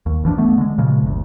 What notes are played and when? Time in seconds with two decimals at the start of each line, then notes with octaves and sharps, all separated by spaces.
0.06 D#2
0.23 F#1 E3 F3 D4
0.38 D1 A3 B3
0.58 D3 G#3
0.78 A#2 C#3 F3 G#3
1.03 G1 D2